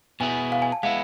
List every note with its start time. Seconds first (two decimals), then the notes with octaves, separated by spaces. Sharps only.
0.20 B2 B3 E4 G#4 G#5
0.52 F5
0.62 G#5
0.72 A5
0.83 G#3 B3 E4 F5